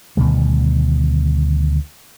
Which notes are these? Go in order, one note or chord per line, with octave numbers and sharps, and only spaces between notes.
D2 B2 D#3 G3